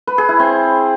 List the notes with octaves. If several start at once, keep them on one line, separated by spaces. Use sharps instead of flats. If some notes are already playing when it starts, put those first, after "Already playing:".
B4
G#4
E4
C4